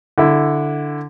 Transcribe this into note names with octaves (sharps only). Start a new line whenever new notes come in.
D3 E4